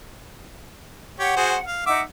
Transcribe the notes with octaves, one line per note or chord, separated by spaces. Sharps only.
G4 C#5 F#5
F#4 G#4 C5
F5
D#4 E5 F#5 D6